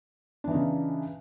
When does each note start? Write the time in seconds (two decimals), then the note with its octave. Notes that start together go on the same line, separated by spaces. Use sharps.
0.44 D4
0.47 E3
0.51 D#4
0.54 C#3